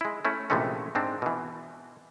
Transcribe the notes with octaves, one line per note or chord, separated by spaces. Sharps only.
G#3 E4
A3 C#4 E4
A#1 C3 E3 G#3 A3 C#4
G#2 C4 D4
B2 E3